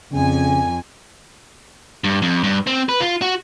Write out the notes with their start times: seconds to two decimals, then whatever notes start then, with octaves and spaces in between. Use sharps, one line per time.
0.12 F2 C#3 G#5
2.04 G2
2.22 F2
2.44 G2
2.67 C4
2.89 B4
3.00 F4
3.22 F#4